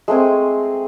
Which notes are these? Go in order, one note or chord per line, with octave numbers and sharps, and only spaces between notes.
G#3 A3 C4 G#5